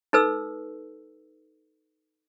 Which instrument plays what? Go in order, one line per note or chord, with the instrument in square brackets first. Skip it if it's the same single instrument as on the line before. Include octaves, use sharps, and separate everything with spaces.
[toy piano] D#4 A4 B4 E6